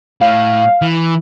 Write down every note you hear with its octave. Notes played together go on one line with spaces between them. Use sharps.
A2 F5
E3